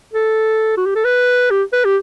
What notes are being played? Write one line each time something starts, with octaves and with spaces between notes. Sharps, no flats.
A4
F#4
G4
A4
B4
G4
B4
G4